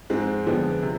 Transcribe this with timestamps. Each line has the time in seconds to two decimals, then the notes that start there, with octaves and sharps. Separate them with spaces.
0.10 G#2 F3 G#3 C4
0.46 F2 D3 F3 G#3 B3
0.82 C3